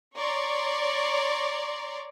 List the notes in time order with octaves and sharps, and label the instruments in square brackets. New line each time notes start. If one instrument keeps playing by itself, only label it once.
[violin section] C#5 D5 A#5 C6 C#6